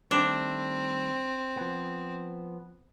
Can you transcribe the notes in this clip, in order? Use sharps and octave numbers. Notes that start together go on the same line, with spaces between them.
D#3 G3 A3 C4 D4
F3 B3